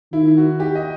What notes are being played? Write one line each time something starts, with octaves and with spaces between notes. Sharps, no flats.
D#3 E4
F#4
G4
D#5